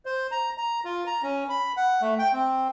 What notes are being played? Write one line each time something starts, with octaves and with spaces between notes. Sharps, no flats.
C5
A#5
A#5
F4
A#5
C#4
B5
F#5
A3
G5
C4